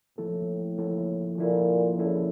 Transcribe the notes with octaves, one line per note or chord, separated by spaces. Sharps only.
A2 F3 A#3 E4 A4
F3 A#3 E4 A4
A#2 F3 A#3 E4 A4
C#3 F3 A#3 E4 A4